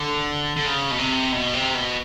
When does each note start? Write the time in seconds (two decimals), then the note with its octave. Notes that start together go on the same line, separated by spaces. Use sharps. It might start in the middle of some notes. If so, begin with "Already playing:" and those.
Already playing: D3
0.56 D3
0.67 C#3
0.91 B2
0.99 C3
1.32 B2
1.54 C3
1.75 B2